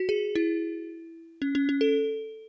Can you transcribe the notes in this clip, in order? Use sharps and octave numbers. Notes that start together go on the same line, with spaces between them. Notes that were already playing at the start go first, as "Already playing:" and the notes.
Already playing: F#4
G#4
E4
C#4
C#4
C#4
A4